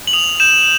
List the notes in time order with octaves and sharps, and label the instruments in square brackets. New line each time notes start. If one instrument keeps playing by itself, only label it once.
[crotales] F#7
D#6 F7
G6 E7